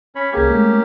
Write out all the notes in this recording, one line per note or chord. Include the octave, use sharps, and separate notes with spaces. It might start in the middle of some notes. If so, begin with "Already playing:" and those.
C#4 C#5 B5
C2 A#3 C#4 G4 G#4 G#6
G#3 A3